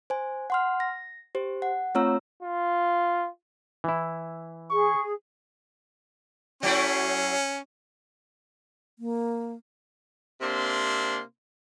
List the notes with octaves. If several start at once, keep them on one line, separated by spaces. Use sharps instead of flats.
C5 G#5
F#5 C6 F6
A#6
G4 C5
F#5
A3 C4 F4 C#5 A#5 E6
F4
E3 E4
G#4 C#6
F#3 A3 C#4 E4
A#3
C3 A#3 C4 D4 C6